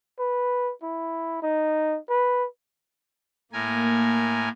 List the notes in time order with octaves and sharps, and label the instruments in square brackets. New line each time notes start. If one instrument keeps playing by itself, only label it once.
[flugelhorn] B4
E4
D#4
B4
[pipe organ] A2 A#4 G#5 [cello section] A#3